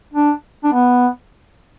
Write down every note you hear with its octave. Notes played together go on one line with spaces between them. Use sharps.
D4
D4
B3